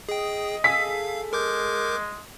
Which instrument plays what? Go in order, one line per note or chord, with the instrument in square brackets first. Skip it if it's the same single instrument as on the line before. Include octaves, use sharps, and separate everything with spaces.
[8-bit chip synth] G#4 G5 [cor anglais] D#5
[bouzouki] G#4 A4 [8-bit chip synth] F5 [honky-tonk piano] E6 B6
[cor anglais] G#3 [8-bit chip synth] A#4 D6 G6